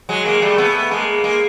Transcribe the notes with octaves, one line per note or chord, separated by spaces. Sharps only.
F#3 G#3
G#3 A#3
G3 A3
A3 B3
G#3 A#3
G#3 A#3